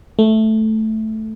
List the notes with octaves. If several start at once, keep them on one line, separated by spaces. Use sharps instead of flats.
A3